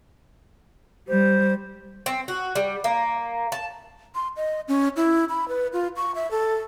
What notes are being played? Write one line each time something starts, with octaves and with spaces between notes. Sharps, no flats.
G3 C5
C4
F#4
G3
A#3
A5
C6
D#5
C#4
E4
B5
B4
F4
C#6
E5
A4